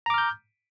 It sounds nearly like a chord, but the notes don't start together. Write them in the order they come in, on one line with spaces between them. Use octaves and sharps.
A#5 D6 F6 G6